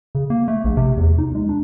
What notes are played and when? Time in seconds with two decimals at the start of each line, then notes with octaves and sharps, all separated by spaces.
0.15 C#3
0.30 A#3
0.48 A3
0.64 A#1
0.77 C3
0.97 E2
1.18 D#4
1.35 G#3
1.49 D4